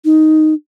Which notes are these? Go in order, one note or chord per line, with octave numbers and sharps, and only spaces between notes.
D#4